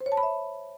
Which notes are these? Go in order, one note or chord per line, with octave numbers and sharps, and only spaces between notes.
C5
C#5
A5
B5
E5